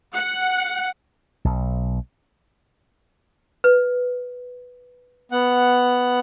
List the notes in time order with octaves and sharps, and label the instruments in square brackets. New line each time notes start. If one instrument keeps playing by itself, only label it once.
[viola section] F#5
[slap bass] B1
[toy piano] B4
[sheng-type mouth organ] B3 F#5